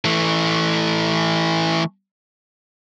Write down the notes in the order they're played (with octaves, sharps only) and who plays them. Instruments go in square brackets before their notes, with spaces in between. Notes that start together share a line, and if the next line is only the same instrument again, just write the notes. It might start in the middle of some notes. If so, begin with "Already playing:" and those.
[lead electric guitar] E3 A3